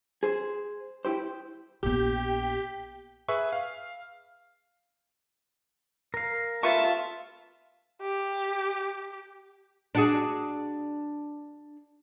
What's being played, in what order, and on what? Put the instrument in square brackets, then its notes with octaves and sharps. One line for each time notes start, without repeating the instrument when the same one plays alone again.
[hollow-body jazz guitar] G#4 C5
E4 G4 C5
[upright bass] A#1 B3 [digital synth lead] G4
[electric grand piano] G#4 B4 E5 C#6
F5
[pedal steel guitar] A#4 F5
[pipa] A3 B4 C#6 [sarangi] F4 [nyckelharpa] E5 A5
[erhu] G4
[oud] D4 F#4 G#4